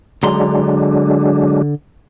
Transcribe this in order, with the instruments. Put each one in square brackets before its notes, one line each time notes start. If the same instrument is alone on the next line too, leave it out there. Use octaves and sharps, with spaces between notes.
[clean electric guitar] D3 A#5 C6 [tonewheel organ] F#3 G#3 D4